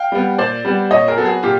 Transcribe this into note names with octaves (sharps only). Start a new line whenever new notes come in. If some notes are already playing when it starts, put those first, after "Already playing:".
Already playing: F5 G5
G3 B3
A#2 C5 D5
G3 B3
A#2 C#5 D#5
G#4 A#4
F#3 B3 A4
F#4 G#4
A#2 F4 G4